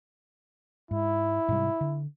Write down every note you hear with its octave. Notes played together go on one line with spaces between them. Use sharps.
G#2 E4
G#2 C3 G3
D3